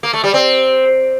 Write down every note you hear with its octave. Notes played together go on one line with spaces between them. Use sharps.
A#3
A3
G3
C4